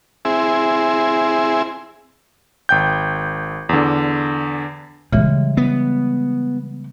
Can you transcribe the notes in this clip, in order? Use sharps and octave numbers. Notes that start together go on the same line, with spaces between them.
C4 E4 G#4
G#1 G5 G6
E2 D3
C#3 E3 G3 G#3
B3